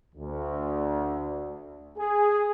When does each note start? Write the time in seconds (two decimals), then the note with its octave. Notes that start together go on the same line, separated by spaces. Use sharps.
0.15 D2
1.98 G#4